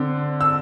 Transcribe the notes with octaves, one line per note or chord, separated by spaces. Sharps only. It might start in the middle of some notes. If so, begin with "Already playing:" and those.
Already playing: D3 C4
E6